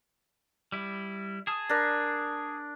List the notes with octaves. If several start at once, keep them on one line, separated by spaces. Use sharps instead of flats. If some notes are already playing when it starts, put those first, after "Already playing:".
G3 E4
G#4 A5 D#6
D4 A#4